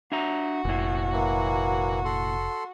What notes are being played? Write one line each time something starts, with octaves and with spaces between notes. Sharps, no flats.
D4 F#4 E5 A#5
F1 A#2 E4
E3 F#3 A#3
A4 C6